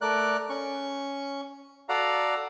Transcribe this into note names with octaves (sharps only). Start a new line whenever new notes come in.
A3 A#4 D5 F#6
C#4 C#6
F#4 A4 D5 F5 F#5 A#5